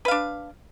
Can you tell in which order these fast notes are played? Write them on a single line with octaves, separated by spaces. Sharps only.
B4 F5 D4